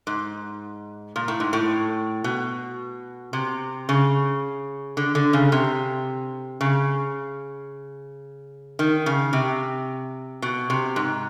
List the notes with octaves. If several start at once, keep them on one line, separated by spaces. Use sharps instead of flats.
G#2
A#2
A2
G#2
A2
B2
C3
C#3
D3
D3
C#3
C3
C#3
D#3
C#3
C3
B2
C3
G#2